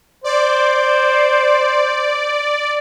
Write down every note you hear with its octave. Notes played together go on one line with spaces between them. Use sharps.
C5 D5